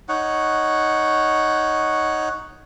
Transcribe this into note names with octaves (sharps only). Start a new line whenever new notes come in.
D#4 C#5 F#5